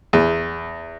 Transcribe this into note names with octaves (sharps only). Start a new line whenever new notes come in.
E2